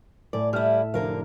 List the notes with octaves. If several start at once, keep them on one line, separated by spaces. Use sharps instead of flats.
A2 A3 D5 G#5
G3 E4 E5 A5 F6
F1 D3 A#4 F5